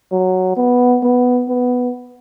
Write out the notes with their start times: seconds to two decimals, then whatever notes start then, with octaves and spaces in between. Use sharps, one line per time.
0.12 F#3
0.57 B3
1.02 B3
1.48 B3